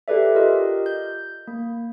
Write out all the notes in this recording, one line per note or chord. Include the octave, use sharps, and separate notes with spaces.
G4 A4 B4 D5 E5
F4 G4 A#4 D#5
G6
A#3